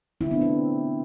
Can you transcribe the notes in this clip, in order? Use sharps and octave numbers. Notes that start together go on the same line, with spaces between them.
D3 A3 C4 E4
B3 D4
C4